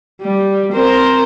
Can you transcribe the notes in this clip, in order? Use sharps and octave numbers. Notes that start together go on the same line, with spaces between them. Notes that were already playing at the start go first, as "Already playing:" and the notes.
G3
C4 A#4 C5